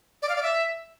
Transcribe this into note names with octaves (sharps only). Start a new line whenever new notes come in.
D5
F5
D5
E5